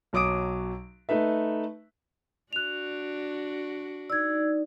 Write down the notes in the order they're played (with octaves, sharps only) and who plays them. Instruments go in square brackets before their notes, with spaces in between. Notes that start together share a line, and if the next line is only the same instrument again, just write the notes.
[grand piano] B1 F#3 D6 D#6 D7
A3 D#4 B4 E5
[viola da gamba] D4 F#4 [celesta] F#6 F7
[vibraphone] D#4 D5 [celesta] E6 G#6